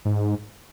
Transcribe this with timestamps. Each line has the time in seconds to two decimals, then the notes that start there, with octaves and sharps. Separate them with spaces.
0.05 G#2